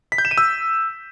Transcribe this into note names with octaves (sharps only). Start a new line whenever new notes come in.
B6
G6
E7
D#7
E6